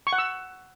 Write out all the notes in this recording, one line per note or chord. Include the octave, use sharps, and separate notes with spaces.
C#6
F#5
E6